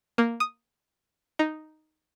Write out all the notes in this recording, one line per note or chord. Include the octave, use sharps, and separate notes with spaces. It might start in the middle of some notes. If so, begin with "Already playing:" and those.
A#3
D#6
D#4